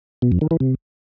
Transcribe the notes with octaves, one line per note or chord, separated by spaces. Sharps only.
B2
F2
D#3
E3
C3